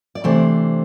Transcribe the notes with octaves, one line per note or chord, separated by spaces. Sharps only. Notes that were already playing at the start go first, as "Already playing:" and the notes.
D5
C3 E3 A3 D4 C5